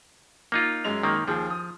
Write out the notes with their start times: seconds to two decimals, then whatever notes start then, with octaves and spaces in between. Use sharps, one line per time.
0.52 A#3 D#4 F4
0.84 F#2 G#3 F7
1.03 D#3 A#3
1.28 D#2 F3 G#4
1.50 D#6